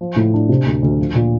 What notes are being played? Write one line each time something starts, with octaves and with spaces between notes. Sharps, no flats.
F3
A2
D4
C3
D2
D2
F3
A#2